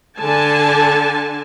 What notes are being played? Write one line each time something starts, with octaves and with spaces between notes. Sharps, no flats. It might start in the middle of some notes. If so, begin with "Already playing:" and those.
D3 G#5 A5